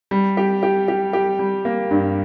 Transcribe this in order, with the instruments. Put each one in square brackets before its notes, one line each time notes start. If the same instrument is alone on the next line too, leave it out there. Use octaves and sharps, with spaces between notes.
[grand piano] G3
G4
G4
G4
G4
G3
A#3
G2